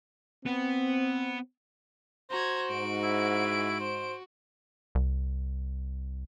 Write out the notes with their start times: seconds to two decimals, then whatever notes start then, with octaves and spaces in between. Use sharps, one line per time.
0.46 B3 C4
2.31 F#4 C5 A#5 G#6
2.71 G#2 D7
3.03 E4
3.80 C5
4.95 C2